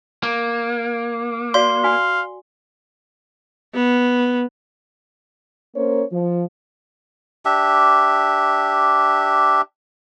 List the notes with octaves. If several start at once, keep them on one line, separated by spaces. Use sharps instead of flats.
A#3
F#4 D5 F5 C6
F#4 F5 G#5
B3
A#3 C#4 A#4 C5 C#5
F3
D4 G4 E5